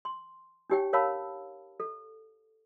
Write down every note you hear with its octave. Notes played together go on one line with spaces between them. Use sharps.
C6
D4 D#4 G4 C#5 G5
A#4 C#5 F5 A5 B5 E6
A4